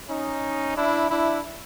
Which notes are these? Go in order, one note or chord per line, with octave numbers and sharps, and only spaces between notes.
C#4 D#4
D4 E4
D4 E4